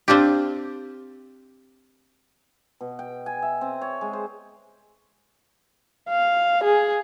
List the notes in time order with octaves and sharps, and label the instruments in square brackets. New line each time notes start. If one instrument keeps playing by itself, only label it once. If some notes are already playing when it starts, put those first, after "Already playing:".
[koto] C4 D4 F4 G4
[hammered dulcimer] B2
G5
G#5
E5
C4
C#5
G#3
C5
[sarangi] F5
G#4